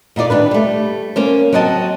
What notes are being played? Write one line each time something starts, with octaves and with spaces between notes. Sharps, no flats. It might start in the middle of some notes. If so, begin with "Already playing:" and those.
A#2 D#4 F4 D5
D#2 D4 B4
G3 A3
A#3 C#4 C5
F#3 C4 F#4 D#5 A5